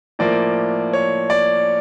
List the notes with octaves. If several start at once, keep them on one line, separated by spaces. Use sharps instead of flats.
A2 F3 A#3 D5
C#5
D5